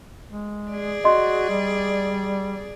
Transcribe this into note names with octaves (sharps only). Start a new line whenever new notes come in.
G#3
G#4 D5
F#4 D#5 C6
G3